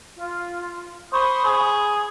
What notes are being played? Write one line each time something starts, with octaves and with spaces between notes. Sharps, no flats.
F4
C5 B5 C#6 D#6
G#4